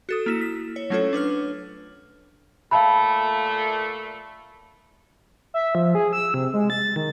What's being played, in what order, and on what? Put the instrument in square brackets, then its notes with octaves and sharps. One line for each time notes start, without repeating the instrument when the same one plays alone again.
[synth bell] F#4 A4 D#6
A#3 E4 E7
B6
C#5
F#3 A3 C#4 F4 A4 C#5
D4 B4 C#5 F6
[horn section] A#2 A3 [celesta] F5 A5 B5
[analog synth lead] E5
F3
G#4
E6
C3
G#3
A6
D#3